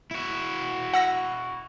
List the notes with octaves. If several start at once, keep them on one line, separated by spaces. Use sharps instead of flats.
E4 F#4
F#5 E6 A#6